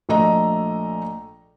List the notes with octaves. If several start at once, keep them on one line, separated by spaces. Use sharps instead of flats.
A#1 A3 D#5 A#5